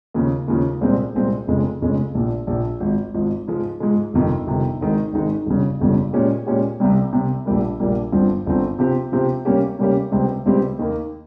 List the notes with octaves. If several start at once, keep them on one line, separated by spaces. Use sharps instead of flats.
D#2 C#3 F3
D#2 C#3 F3
C2 A#2 G#3 C4
C2 A#2 G#3 C4
F1 F2 C#3 G#3
F1 F2 C#3 G#3
A#1 A#2 F3
A#1 A#2 F3
G#1 G#2 F3
G#1 G#2 F3
G#2 F3 G#3
G#2 F3 G#3
G1 F2 C3 D#3
G1 F2 C3 D#3
G#1 G#2 D#3 G#3 D#4
G#1 G#2 D#3 G#3 D#4
G1 F2 C#3 G3
G1 F2 C#3 G3
A#2 G#3 C#4 G4
A#2 G#3 C#4 G4
C2 C3 G3
C2 C3 G3
A#1 A#2 G3 A#3
A#1 A#2 G3 A#3
G1 G2 F3 C4
G1 G2 F3 C4
C3 F3 C4 G4
C3 F3 C4 G4
C3 G3 A#3 C#4 G4
C3 G3 A#3 C#4 G4
C#2 C3 G3 C4 G4
C#2 C3 G3 C4 G4
D#2 D#3 A#3